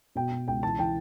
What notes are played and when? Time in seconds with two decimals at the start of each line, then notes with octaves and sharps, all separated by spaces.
0.15 B2 G5
0.32 B2
0.48 C#2 G5
0.63 E3 A5
0.79 E3 G5